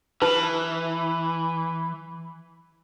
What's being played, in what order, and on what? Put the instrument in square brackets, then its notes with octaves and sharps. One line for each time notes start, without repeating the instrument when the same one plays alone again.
[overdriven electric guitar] E3 [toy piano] B4 A5